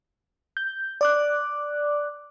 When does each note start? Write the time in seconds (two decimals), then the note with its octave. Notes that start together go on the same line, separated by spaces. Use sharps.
0.57 G6
1.01 D5 D6 F#6